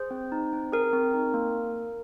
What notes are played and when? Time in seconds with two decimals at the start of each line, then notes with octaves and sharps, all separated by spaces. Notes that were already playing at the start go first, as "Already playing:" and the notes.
Already playing: G#4 C5
0.11 C4
0.32 D#4
0.53 C4
0.72 G#4 A#4
0.93 C4
1.14 D#4
1.34 A#3